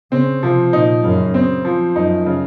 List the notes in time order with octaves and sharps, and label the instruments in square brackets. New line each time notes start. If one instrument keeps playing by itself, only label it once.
[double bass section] C#3 [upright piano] C4
[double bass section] C3 [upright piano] F3
[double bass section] A#2 [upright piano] D#4
[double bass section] F#2 [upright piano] C#3
[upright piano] C4
F3
[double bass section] F#2 [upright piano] D#4
[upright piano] C#3